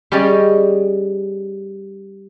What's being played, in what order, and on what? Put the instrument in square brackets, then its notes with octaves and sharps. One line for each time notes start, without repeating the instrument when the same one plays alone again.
[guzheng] G3 C#4 G#4 D5 D#5